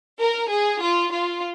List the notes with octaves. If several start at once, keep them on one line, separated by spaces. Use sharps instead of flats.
A#4
G#4
F4
F4